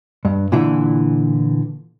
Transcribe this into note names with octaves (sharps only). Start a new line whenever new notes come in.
G2
A#2 D3 E3 E4